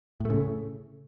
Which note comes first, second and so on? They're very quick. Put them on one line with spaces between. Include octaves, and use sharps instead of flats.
A2 A3 C#3